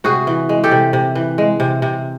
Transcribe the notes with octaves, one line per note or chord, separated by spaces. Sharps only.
C3 F#4 G#4
E3
G#3
G4 A4
C3
C3
E3
G#3
C3
C3